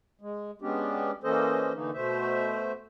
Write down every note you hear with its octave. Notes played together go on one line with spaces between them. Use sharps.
G#3
G#3 B3 C#4 D4 G4
E3 A#3 C#4 A4 C5 D#5
D3 E3 A3 A#3 D#4
B2 A3 C5 E5